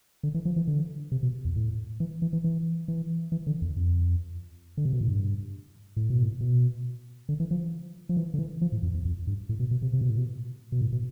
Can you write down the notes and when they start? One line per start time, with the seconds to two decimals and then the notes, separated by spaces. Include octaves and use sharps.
0.23 D3
0.34 E3
0.45 F3
0.56 E3
0.67 D3
1.12 C3
1.23 B2
1.45 E2
1.56 A2
2.00 E3
2.22 E3
2.33 E3
2.44 E3
2.88 E3
3.32 E3
3.47 D3
3.62 E2
3.76 F2
4.77 D3
4.85 C3
4.93 B2
5.01 A2
5.08 G2
5.97 A2
6.10 B2
6.23 A2
6.41 B2
7.29 D3
7.40 E3
7.51 F3
8.09 F3
8.17 E3
8.34 D3
8.39 E3
8.61 F3
8.72 A2
8.83 F2
8.94 E2
9.05 F2
9.27 G2
9.49 A2
9.60 B2
9.71 B2
9.82 C3
9.93 C3
10.01 B2
10.09 A2
10.17 B2
10.72 B2
10.81 A2
10.93 B2